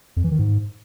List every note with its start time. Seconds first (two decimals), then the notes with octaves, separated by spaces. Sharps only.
0.16 F2
0.24 E3
0.31 D#3
0.39 G#2